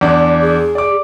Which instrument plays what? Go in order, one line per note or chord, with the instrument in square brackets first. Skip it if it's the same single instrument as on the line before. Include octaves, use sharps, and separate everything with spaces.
[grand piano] E2 D4
[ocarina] G#4
[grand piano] D5 D6